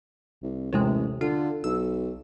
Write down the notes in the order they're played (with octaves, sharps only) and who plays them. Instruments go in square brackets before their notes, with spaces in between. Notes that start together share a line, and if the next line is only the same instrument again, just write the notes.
[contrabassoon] C2
[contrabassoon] A1 [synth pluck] D#2 C3 G#3
[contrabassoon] D3 [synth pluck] F4
[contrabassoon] B1 [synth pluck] E6